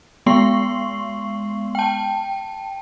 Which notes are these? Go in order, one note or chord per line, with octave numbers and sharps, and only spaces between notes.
G#3 B3 C6 C#6 C7
G5 A5